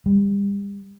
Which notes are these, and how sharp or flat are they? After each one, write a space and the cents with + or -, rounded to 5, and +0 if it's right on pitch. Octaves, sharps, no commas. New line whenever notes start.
G3 +35